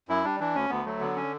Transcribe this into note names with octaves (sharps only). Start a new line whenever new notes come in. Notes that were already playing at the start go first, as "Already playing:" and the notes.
F#2 E4
G3 D4
E3 D4
D2 C#4
D2 B3
F#3 A3
D3 B3
C#4